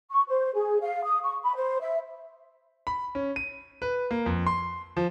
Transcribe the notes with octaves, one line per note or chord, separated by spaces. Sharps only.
C#6
C5
G#4
F5
D#6
C#6
B5
C5
E5
B5
C#4
D#7
B4
A#3
F2
C6
F3